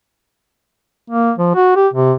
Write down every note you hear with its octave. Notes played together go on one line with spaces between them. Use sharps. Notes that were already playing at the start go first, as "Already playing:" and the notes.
A#3
F3
F#4
G4
C3